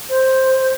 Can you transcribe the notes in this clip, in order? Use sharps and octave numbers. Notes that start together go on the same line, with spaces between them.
C5